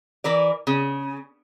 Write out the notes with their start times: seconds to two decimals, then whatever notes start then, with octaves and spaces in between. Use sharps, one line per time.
0.24 E3 A#4 D5
0.67 C#3